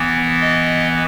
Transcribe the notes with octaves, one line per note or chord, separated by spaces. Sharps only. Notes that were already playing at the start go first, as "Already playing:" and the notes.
Already playing: E3 B3
D#5